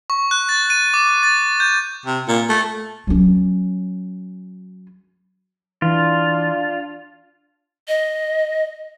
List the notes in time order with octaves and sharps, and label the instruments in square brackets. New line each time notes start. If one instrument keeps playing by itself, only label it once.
[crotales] C#6
F#6
A6
D#7
D6
A6
G6
[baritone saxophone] C3
A#2
A3
[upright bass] F#3 C#4
[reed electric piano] E3 [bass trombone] D4 [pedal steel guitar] F4
[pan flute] D#5